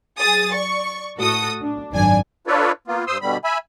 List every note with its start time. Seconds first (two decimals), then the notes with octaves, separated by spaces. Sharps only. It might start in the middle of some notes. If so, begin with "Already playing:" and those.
0.19 F#3 G#4 D#6 A6
0.53 D5 C#6
1.18 A2 F#4 A4 D#6
1.61 D4
1.91 G#1 F#2 D4 G#5
2.47 D4 F4 A4 B4 C#5 D5
2.88 A#3 B3 F4
3.07 G2 C5 C6 D#6 E6
3.22 B2 D3 G3 B5
3.44 E5 G#5 B5